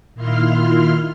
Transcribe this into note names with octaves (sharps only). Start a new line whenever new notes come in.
A#2 D#3 E4 F4 C6 F6